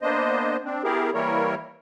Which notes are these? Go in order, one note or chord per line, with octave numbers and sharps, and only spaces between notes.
A#3 B3 D4 C5 D#5
C4 D4
B3 E4 G4 G#4 A#4
E3 G3 A#3 E4 A#4 C#5